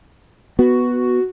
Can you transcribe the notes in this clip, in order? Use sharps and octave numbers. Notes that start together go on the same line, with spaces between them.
B3 F#4